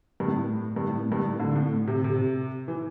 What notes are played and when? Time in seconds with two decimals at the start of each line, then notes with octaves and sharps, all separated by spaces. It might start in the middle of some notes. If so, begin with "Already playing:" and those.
0.20 G2
0.28 A2
0.76 G2
0.88 A2
1.12 G2
1.24 A2
1.40 D3
1.55 A2
1.88 C3
2.04 C3
2.68 E3